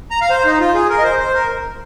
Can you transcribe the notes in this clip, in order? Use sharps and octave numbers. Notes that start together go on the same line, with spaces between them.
A#5
F5
C5
D#4
F4
G#4
A#4
D#5
C5
C5
A#4